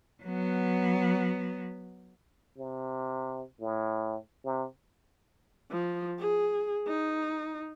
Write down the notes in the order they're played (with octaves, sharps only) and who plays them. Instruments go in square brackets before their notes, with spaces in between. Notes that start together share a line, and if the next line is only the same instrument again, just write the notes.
[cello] F#3 B3
[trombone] C3
A2
C3
[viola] F3
G#4
D#4